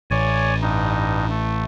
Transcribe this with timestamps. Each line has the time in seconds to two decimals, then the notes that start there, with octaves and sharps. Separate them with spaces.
0.11 A1 C#5 D5 G#5
0.62 G2 D#4
1.30 A3